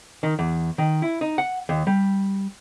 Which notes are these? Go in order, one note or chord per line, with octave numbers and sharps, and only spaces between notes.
D#3
E2
D#3
E4
D#4
F#5
D#2
G3